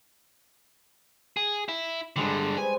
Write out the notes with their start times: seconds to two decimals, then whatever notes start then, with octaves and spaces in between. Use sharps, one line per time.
1.37 G#4
1.69 E4
2.16 G2 D3 G3 G#3
2.57 B4 C5 G#5